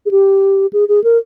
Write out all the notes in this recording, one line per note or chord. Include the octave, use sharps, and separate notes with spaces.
G#4
G4
G#4
G#4
A#4